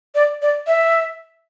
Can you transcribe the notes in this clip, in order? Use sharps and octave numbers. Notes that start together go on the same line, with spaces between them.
D5
D5
E5